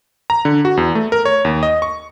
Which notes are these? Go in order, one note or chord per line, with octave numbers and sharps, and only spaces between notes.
A#5
D3
F#4
E2
A3
A#4
C#5
D#2
D#5
C#6